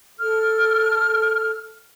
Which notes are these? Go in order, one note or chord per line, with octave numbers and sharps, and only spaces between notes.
A4 F6